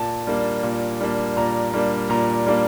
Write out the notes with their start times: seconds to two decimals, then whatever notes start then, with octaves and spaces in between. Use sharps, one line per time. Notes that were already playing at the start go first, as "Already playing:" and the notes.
Already playing: A#2 A5
0.27 G3 A#3 D4
0.63 A#2
1.01 G3 A#3 D4
1.36 A#2 A#5
1.74 G3 A#3 D4
2.10 A#2 A#5
2.47 G3 A#3 D4